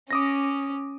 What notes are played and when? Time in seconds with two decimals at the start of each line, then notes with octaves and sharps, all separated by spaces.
0.11 C#4 D6 D#6 A#6